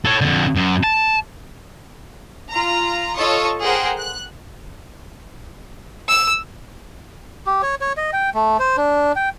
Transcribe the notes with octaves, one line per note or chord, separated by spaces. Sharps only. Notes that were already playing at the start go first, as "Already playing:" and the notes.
A4 C#5
F2 D3
F#2
A5
F4 A#5
F4 A4 C#5 D#5 C#6 D#6
G#4 A#4 C5 F#5 G5 C6
F#6
E6
G4
C#5
C#5
D#5
G5
A3
C5
D4
G5